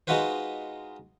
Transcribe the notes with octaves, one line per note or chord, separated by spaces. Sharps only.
G#3 D#4 F4 F#4 B4 C5